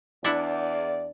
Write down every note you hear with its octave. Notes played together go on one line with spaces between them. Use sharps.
E2 D4 E4 D5 F#5